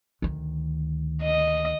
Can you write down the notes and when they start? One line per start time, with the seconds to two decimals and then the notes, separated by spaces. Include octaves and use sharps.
0.22 D2 D#3
1.22 D#5